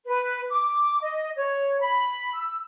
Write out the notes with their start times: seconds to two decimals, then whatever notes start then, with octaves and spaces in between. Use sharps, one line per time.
0.05 B4
0.50 D6
1.00 D#5
1.36 C#5
1.80 B5
2.34 E6